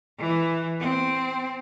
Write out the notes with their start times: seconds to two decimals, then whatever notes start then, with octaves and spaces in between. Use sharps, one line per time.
0.19 E3
0.80 C4